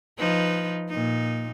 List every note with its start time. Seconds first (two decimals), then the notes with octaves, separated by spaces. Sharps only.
0.18 F3 D#4 B4
0.88 A#2 D#4